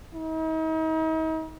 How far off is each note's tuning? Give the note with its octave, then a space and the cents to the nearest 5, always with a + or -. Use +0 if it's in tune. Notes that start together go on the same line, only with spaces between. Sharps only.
D#4 +40